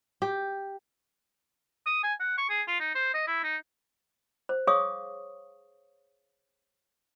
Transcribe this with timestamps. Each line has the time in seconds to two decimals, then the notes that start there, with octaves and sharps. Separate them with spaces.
0.22 G4
1.86 D#6
2.04 G#5
2.20 F#5
2.38 C#6
2.50 G#4
2.68 F4
2.80 D#4
2.95 C5
3.14 D#5
3.27 E4
3.43 D#4
4.49 C5
4.67 G#4 C#5 F5 C#6 D#6